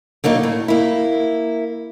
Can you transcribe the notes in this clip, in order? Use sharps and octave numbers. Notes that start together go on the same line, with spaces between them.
D3 F#3 A#3 D#4
A2
A#3 E4